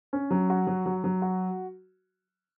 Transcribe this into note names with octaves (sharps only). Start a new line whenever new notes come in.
C#4
F#3
F#4
F#3
F#3
F#3
F#4